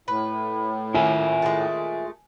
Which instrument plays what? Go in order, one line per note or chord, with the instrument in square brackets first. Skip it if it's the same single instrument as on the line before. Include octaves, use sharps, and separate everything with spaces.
[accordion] A2 [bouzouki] B4
[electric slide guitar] F4 A#4 E5 [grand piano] G#5
[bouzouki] G#3 A3